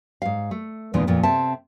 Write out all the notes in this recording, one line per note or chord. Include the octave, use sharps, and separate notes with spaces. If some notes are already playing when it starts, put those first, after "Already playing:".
G#2 F5
A3
E2 A#2 D3 E3 G#3
F2 A#2 F3
C3 C4 A4 E5 A5